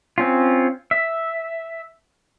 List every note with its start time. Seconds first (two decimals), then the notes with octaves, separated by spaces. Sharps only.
0.18 C4 C#4 F4
0.91 E5